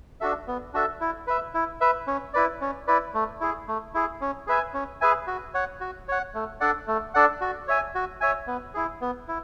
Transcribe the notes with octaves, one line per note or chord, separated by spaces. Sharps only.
D4 F#4 A4 E5
B3
D4 F#4 A4 E5
E4
B4 E5
E4
B4 E5
C#4
E4 B4 D5
C#4
E4 B4 D5
A3
E4 G#4
A3
E4 G#4
C#4
G#4 B4 E5 G#5
C#4
G#4 B4 E5 G#5
F#4
C#5 F#5
F#4
C#5 F#5
A3
D4 A4 D5 F#5
A3
D4 A4 D5 F#5
F#4
C#5 E5 G#5
F#4
C#5 E5 G#5
B3
E4 G#4
B3
E4